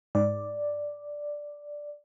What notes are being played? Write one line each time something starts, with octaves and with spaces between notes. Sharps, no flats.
G#2 D5